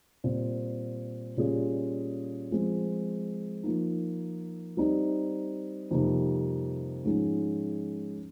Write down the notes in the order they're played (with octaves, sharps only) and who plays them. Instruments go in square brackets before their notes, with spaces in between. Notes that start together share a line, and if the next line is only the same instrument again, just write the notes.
[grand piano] A#2 G3 C4
A#2 G3 C#4 F4 G#4
F3 G#3 C4
F3 A#3 D#4
G3 C4 D#4
F2 C3 G3 A#3 D#4
G#2 F3 G#3 C#4